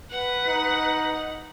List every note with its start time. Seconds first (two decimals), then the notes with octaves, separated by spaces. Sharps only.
0.11 B4 F#5
0.48 D#4